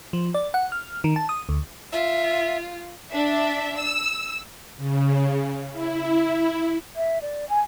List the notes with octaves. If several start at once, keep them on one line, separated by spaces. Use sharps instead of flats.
F3
D5
F#5
F6
D#3
A5
D#6
D2
F4 E5
D4 E5
E6
C#3
E4
E5
D5
G#5